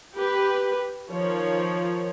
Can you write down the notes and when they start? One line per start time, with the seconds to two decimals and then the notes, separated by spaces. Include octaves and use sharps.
0.16 G4 B4
1.09 D#3 F3 C#5